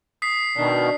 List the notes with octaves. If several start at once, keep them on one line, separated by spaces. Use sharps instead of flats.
D#6 B6 C7
B2 D#3 D4